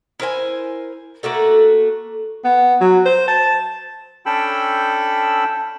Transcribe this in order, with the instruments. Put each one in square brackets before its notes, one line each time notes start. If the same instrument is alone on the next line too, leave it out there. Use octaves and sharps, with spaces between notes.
[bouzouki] E4 A#4 C5 G#5
A3 A#3 F#4 A4
[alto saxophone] B3
F#3
C5
A5
[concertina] C#4 D4 A4 G5 B5 E6